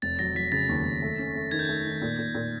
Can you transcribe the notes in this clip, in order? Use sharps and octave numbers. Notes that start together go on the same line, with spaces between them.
F1 A6
F#3 A#6
F#3 B6
C#3 A6
D#2
D#2
A3
C#4
A3
D#3 G#6
G6
A3 G#6
D#3
A#2
A#2
A#2